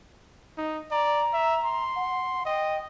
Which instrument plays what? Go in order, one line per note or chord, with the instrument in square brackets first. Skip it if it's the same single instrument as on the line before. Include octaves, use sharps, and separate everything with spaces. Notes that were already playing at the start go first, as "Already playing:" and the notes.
[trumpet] D#4
[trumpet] D5 [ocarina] A#5
[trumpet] E5
C6
[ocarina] F#5
[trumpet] D#5 [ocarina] G5